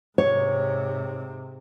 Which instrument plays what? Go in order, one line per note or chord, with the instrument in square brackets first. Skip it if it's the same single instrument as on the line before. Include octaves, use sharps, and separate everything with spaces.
[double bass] G#2 C3 [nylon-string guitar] C#5